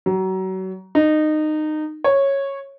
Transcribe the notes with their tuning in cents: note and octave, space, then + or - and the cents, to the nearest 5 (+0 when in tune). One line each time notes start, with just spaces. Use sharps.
F#3 +30
D#4 -20
C#5 -10